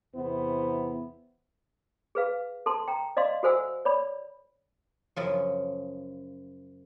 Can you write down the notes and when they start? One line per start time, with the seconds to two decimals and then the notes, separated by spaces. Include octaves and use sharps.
0.16 E2 C3 B3 E4 C5
2.15 G#4 B4 F5
2.66 A4 A5 C6
2.88 G5 A#5
3.17 D5 D#5 F5 C6
3.43 F#4 A4 C5 F#5 G#5 E6
3.85 C#5 D5 B5
5.16 F#2 C#3 F3